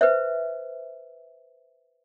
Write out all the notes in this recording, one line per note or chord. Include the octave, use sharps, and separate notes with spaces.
B4 C5 E5